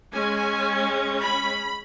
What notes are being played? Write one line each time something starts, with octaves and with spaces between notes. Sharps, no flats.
G#3 C#4 G#5
B5